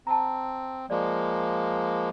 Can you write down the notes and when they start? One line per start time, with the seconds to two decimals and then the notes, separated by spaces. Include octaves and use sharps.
0.07 C4 A5 A#5
0.90 F3 G#3 A#3 D5